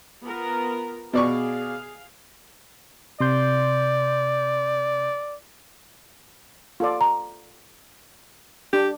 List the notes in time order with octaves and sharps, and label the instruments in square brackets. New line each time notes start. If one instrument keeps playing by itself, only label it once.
[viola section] B3 F4 A#4
[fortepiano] B2 D5 C#6 [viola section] G#4 F5
[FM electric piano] C3 C6 G6 [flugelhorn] D5
[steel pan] F4 A4 D5
[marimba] A#5
[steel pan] D4 [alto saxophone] G4